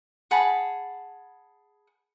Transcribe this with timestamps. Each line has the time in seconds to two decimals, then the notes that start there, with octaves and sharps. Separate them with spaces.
0.31 G#4 F#5 A5 B5